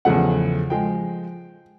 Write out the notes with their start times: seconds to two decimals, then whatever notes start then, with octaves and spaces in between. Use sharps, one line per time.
0.05 E2 C#3 F3 A3 F#5
0.70 F3 G#3 G5